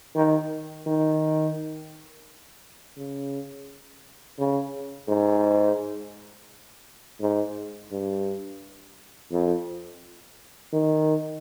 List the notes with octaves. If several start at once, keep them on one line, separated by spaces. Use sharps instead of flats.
D#3
D#3
C#3
C#3
G#2
G#2
G2
F2
D#3